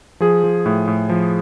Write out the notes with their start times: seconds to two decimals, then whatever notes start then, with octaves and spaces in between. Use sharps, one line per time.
0.20 F3 G#4
0.44 F3
0.66 A2
0.88 A2
1.09 F3